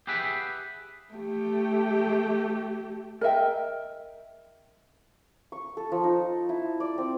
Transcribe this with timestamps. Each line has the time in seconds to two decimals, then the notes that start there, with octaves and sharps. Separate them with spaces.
0.07 G4 G#4 B4 E5 F#5 G5
1.13 A3 G4
3.21 A#4 D#5 E5 G5
5.52 C#6
5.77 A4
5.92 F3
6.03 D#4
6.49 E4
6.80 D5
6.98 C4